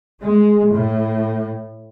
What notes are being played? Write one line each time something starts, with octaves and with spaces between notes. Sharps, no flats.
G#3
A2